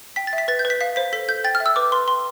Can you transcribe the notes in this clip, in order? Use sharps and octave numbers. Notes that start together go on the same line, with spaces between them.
G5 B6
A6
E5
B6
B4 A6
G6
B4
B6
F5 B6
C5 B6
A4 B6
A4 G6
G5 A6
F6
E5
E6
B4 D6
B4 C6
G5 C6